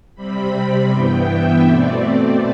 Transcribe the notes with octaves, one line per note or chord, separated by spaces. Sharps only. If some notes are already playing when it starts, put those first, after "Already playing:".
C3 G3 C4 B5
G2 E3 B3 G5
E5
B2 A3 C4 D5
D5